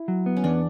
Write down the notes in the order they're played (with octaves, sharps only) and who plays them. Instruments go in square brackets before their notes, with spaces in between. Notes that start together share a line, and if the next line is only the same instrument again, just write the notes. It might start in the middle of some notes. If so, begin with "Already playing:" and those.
Already playing: [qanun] E4
[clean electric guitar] F#3
B3
[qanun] C#4
[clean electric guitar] E2 [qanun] D4